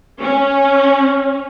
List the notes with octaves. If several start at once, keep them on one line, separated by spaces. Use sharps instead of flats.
C#4